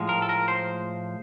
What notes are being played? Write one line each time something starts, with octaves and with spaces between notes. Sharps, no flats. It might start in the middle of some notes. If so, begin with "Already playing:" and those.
Already playing: A2 F3 G#3
A#4
A4
A#4
C5